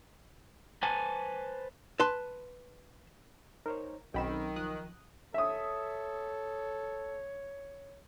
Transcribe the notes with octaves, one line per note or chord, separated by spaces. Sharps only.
B4 C5 G#5 A5
B4 A5 C6
D#4 A#4 C5 C#5
B1 D#3 C4 C#4 G5 B5 E6
F3 D#6 F#6
A4 C#5 E5 D#6